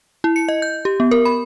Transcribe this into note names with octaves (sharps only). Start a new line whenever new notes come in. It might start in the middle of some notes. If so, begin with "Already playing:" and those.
E4
C#7
D#5
G6
G4
B3
A#4
B5